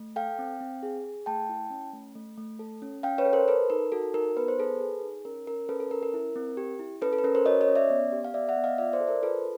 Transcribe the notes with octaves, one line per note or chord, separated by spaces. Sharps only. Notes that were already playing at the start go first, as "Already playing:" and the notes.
Already playing: A3
A4 F5 G5
C4
C4
G#4
G#4
A3 G5 A5
E4
C#4
A3
A3
A3
A4
C#4
C#4 F5 G5
B4 C#5
A4
A#4 C5
A4 B4
D#4 A#4
F#4 A4
D#4 A#4
B3 B4
C5
G#4 A4 B4
G#4
D#4
C#4 A#4
C#4 A#4
C#4 A4 B4
A4
C#4 A#4
A#4
E4
C4
G4
E4
C#4 A4 B4
A4
B4
C#4 A#4
A#4 C5
F#4 C#5 D#5
C#5 D#5
C#4
D5 E5
B3
G4
F5
B3 D5 E5
E5 F#5
B3
D#5 F5
F4 D5 E5
C5 D5
A4
A#4 C5
F4 A4 B4